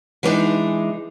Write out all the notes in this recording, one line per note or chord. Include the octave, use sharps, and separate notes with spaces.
E3 G#3 A#3 D4 D#4